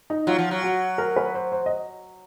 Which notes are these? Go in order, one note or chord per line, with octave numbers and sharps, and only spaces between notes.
D#4
F#3 F4
F3
F#3
F#4
A#4
B4
C5
C5
D#5